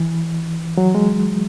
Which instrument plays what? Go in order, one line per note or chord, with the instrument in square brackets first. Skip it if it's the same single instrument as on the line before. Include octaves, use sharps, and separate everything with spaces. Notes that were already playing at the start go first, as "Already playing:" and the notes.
Already playing: [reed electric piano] E3
F#3
G#3